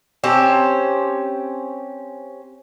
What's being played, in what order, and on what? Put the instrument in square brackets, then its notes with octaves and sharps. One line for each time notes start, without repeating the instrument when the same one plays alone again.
[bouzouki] C4 C#4 G4 A5